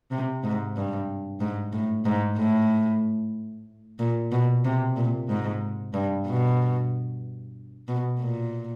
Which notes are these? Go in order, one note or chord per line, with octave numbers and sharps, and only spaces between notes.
C3
G#2
G2
G#2
A2
G#2
A2
A#2
B2
C3
A#2
G#2
G2
B2
B2
A#2